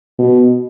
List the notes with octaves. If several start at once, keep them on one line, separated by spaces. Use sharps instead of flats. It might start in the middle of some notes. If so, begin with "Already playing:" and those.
B2